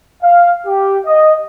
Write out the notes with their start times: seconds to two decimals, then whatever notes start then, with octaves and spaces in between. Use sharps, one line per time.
0.23 F5
0.67 G4
1.06 D#5